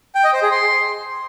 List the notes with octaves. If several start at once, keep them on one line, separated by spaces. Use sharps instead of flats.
G5
D#5
C5
G#4
C6